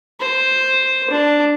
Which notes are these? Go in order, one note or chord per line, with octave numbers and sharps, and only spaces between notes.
C5
D4